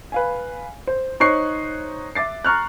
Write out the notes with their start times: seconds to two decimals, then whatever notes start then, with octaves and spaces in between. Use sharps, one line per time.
0.12 B4 F5 G#5
0.87 C5
1.20 D#4 C5 C#5 C#6 F#6 C7
2.15 E5 D6 A6 C7
2.44 A#5 C#6 F6 F#6